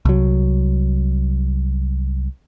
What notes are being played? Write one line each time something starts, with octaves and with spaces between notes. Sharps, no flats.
C2 F#3